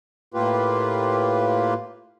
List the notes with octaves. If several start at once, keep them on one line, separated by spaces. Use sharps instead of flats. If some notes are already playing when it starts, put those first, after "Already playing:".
A2 A#3 F4 G4 B4